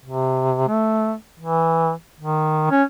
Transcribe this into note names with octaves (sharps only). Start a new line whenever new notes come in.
C3
A3
E3
D#3
C#4